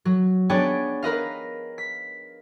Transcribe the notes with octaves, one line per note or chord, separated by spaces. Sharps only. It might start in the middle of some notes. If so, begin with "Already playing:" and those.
F#3
B3 D4 G#4 C#5 D5 G5
A#4 B4 D#5 F5
B6